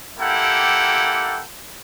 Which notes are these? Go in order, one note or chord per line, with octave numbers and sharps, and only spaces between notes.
A#3 E4 G4 A4 F#5 G5